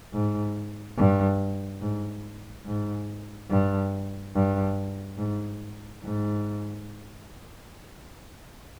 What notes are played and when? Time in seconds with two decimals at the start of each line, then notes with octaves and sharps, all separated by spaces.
0.13 G#2
0.97 G2
1.81 G#2
2.65 G#2
3.50 G2
4.35 G2
5.18 G#2
6.03 G#2